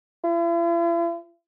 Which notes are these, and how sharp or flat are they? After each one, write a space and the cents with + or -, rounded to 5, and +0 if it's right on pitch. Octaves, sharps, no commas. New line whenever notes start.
E4 +45